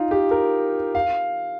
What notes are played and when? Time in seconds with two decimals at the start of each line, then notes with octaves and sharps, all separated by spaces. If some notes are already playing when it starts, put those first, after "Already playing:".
Already playing: D#4 F4
0.11 G4
0.31 A#4
0.95 F5